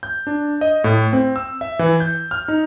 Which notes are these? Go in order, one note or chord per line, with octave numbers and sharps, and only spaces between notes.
G6
D4
D#5
A2
C4
E6
E5
E3
G6
F6
D#4